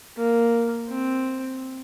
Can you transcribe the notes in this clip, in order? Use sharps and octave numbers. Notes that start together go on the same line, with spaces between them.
A#3
C4